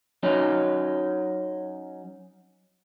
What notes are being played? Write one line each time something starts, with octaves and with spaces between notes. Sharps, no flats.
F#3 C#4 D#4